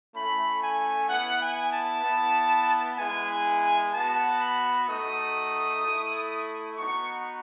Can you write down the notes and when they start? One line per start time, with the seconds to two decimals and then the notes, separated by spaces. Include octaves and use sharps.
0.14 A3 C#4 E4 B5
0.62 G#5
1.08 B3 E4 F#5
1.41 G#5
1.72 A5
2.04 B3 E4
2.98 G#3 B3 E4 G#5
3.93 B3 F#4 A5
4.40 B5
4.87 A3 D#4 F#4 D#6
5.82 A3 E4
6.77 B3 D#4 F#4 C#6